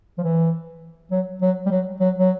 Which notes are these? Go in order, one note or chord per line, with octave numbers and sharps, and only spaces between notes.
F3
E3
F#3
F#3
G3
F#3
F#3
F#3